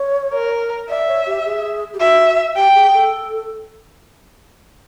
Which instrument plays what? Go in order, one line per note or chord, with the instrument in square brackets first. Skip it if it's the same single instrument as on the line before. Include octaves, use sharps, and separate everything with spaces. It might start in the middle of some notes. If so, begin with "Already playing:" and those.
Already playing: [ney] C#5
[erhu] A#4
[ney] D5 [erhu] E5
[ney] C#5
G4
G#4
G4
[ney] F#4 [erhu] E5
[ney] G4 [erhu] G5
[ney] G#4
A4